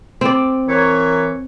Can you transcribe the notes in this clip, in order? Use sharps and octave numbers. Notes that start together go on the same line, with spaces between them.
C4 D5
E3 A#4 C#5